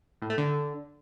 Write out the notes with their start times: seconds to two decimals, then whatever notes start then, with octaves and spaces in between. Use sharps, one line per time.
0.22 A2
0.30 A3
0.38 D3